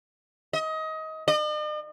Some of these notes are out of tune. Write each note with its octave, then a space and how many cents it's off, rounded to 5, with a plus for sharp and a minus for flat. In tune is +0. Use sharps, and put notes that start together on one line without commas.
D#5 +25
D#5 -45